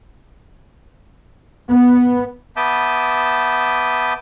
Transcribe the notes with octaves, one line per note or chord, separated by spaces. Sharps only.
B3
B3 E5 A5 D6 D#6 G6